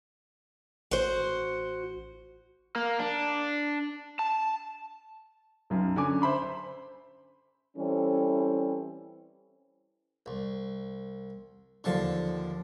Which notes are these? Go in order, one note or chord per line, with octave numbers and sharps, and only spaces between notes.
A1 F#4 C5
A#3
D4
A5
B1 F#2
D3 C#4 G#5 D6
C5 E5 B5 C6
C5
E3 G3 C4 C#4 A4
C2
D#2 D3 F3 A4 A5 C6